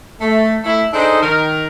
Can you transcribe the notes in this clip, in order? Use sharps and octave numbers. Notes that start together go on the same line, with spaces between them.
A3
A3 E4
D4 D#4 G#4 A4 C5 D#5
D#3 A#4